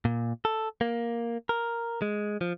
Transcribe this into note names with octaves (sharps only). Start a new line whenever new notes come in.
A#2
A4
A#3
A#4
G#3
F3